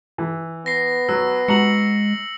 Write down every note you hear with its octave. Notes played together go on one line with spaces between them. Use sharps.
E3
B3 A#6 C7
F#3 E6
G#3 F#4 A#5 C#7 F#7